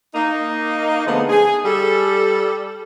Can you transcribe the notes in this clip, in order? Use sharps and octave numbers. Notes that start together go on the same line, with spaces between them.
A#3 D#4
D3 F3 G#3 A3 B3
G#4
G3 A4